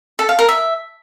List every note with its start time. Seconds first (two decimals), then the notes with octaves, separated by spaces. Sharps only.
0.19 A4
0.29 F5
0.39 A#4
0.49 E5